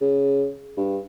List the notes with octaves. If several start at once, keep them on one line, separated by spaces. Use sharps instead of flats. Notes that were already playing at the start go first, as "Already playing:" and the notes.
C#3
G2